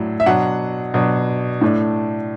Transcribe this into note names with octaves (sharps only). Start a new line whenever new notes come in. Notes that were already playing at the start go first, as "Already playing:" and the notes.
Already playing: A2 F#3 D4
E5
B2 F#3 D4 F#5
B2 F#3 D4
A2 A3 D4